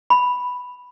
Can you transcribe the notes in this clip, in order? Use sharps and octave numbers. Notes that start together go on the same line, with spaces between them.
B5